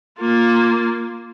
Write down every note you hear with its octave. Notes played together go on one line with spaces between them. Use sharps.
A#3 F4